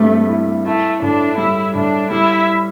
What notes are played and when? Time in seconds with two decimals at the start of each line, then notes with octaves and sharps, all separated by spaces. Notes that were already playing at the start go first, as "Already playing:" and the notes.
Already playing: G2 G3 A3 C4
0.29 E4
0.65 A3 E4
1.02 A2 D4
1.38 G3 E4
1.75 A2 D4
2.11 G3 E4